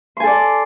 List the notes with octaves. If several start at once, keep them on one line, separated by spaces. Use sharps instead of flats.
A4 D5 G#5 C6